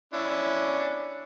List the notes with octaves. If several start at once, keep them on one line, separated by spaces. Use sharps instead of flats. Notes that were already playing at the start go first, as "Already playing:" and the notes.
C#4 D4 E4